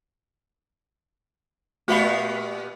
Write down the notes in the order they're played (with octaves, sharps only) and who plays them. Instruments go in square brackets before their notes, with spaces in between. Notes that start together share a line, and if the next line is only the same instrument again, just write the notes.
[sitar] A#2 B3 G4 [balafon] A3 B5 [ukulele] F#4 E5 F5